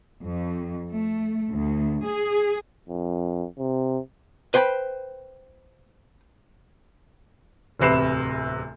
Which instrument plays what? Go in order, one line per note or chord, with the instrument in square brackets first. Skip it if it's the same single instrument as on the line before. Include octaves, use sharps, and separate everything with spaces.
[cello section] F2
A3
D2
G#4
[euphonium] F2
C3
[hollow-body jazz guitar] B4 C5 G5 G#5 B5
[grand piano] D1 E2 C3 B4 C7 E7